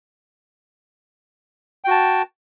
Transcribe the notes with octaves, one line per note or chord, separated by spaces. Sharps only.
F#4 G5 A5